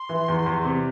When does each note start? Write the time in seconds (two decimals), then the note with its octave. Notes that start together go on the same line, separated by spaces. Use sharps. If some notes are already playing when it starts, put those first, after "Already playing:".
Already playing: C6
0.09 E3
0.28 E2
0.46 E2
0.65 C3